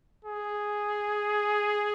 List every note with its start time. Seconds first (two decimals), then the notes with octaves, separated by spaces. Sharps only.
0.25 G#4